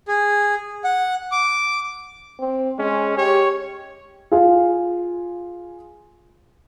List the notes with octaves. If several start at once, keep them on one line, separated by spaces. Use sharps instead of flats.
G#4
F#5
D6
C4
G#3 C#4
G4 C#5
F4 G#4 F5